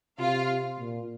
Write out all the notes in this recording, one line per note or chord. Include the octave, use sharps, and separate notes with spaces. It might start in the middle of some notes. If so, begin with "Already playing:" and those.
C3 F4 F5
A#2